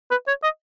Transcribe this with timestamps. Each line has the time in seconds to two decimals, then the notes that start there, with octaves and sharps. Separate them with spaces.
0.11 B4
0.28 C#5
0.43 D#5